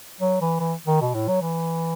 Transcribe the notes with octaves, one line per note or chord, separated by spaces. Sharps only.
F#3
E3
E3
D#3
B2
A2
F#3
E3